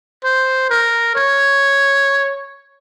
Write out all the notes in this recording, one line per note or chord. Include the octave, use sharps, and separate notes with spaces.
C5
A#4
C#5